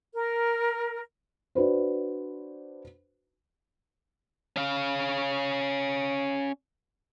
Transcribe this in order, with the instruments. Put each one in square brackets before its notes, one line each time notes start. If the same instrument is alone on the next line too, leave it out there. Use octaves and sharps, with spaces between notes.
[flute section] A#4
[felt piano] D4 F#4 B4 C5
[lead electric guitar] C#4 F5